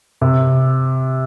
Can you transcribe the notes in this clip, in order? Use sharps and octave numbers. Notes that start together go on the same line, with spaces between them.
C3